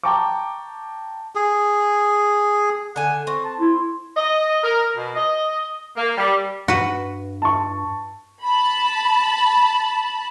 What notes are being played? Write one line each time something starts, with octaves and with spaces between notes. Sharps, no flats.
G5 A5 A#5 C#6 D6
G#4
D3 F#5 G#5
C4 C#6
A5
E4 C6
D#5
A#4
B2
D#5
A#3
G3
G2 F#4 B4
A5 C#6
A5 B5